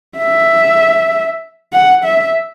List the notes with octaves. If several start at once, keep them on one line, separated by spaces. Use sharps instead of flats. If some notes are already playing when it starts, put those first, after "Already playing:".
E5
F#5
E5